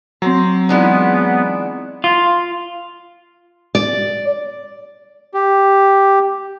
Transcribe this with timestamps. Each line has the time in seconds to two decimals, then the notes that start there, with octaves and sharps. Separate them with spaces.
0.22 F#3 C4 C5 A#5
0.69 E3 G#3 B3 D4 D#4 F4
2.04 F4
3.75 D5
5.34 G4